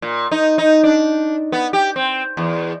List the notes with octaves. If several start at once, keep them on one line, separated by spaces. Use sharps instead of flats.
A#2
D#4
D#4
D4
B3
G4
C4
E2